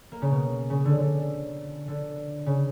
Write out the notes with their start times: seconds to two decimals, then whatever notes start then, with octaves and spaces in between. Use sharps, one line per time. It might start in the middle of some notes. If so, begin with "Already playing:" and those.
0.12 A#3
0.22 C#3
0.31 B2
0.70 C#3
0.85 D3
1.00 D3
1.88 D3
2.46 C#3